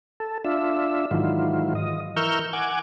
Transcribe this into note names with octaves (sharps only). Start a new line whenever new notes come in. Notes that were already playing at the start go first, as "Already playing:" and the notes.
A4
D4 F4 E5
G#2 D#3 E3 F#3 F4
D#5
E3 A#4 C#6 E6 F6 G6
F#5 G#5 D6